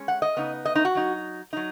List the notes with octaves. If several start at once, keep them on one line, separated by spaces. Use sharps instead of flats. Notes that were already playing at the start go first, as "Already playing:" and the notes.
Already playing: G#3 C#4
F#5
D#5
C#3 B3 D#4
D#5
D#4
F#4
F#3 D#4
F#3 D#4